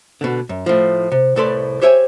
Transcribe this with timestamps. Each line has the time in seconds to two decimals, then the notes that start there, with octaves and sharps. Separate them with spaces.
0.21 B2 D3
0.49 F#2
0.66 A2 F3
1.12 C3
1.36 C2 A2 A4 B4 D5 C6
1.81 G4 C5 C#5 E5 G5 G#5